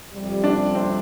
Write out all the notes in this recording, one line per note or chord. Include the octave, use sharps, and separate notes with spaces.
F2 C3 G3
D4
C4